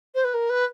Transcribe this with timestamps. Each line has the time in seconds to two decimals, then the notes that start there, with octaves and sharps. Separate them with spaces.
0.15 C5
0.24 B4
0.34 A#4
0.49 B4